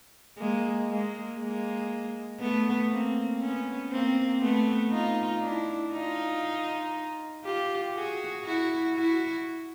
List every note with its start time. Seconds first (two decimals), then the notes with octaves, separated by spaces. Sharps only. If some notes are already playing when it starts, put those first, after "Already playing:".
0.38 G#3 A#3
0.89 G#3 A#3
1.39 G#3 A#3
2.40 A3 B3
2.90 A#3 C4
3.41 B3 C#4
3.91 A#3 C4
4.42 A3 B3
4.92 D#4 F4
5.43 D4 E4
5.93 D#4 F4
7.44 F4 G4
7.95 F#4 G#4
8.45 E4 F#4
8.96 E4 F#4